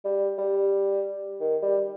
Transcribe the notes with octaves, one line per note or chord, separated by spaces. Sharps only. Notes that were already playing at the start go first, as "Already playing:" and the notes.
G3
G3
D#3
G3